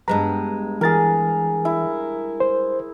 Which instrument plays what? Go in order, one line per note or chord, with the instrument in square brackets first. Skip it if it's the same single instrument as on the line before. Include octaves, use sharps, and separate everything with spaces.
[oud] G2 G#3 B3 [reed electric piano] A#5
[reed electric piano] E3 A6 [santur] G#4 A#4
[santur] E4
[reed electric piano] C5